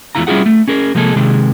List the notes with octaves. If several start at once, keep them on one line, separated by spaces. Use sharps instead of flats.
E2 C3 G#3 E4 F4 A#5
G3 C#4 E4 F4 G#4 F#5
A3
C#4 G#4 A#4
C3 F3 G#3 A#3 G#4 A4
C3 D#3 G#3